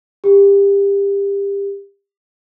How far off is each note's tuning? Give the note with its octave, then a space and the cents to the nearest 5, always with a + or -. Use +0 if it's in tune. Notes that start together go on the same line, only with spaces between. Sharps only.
G4 +25